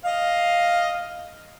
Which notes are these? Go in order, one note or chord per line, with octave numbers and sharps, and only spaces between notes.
D#5 F5